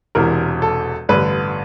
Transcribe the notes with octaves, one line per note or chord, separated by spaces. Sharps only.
E1 E2 C3 E3 A#4
A4
A1 G2 D3 B4